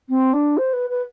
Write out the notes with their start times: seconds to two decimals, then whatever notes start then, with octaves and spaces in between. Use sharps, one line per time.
0.09 C4
0.33 D4
0.57 C5
0.73 B4
0.90 B4